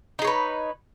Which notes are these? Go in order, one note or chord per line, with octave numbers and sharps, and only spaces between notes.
D#4 G#4 B4 C#5